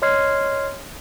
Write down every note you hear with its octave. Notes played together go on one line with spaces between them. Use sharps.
C#5 D#5 C6 F6 G#6 C7